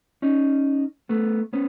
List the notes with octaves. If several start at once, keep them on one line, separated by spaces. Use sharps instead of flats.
C#4 D#4
A3 B3
B3 C#4